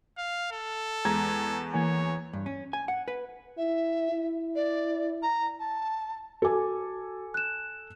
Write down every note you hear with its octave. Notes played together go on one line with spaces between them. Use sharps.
F5
A4
E2 G#3 A#5 G#6
E3 A#3 C#5 G#5
G2
C#4
G#5
F#5
B4
E4 E5
E4
D5
A#5
A5
F#4 A4 G#5 D6
F#6 E7